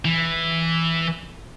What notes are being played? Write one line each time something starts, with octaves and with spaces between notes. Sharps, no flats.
E3